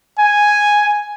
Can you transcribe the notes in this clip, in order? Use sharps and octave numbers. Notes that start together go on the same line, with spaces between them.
G#5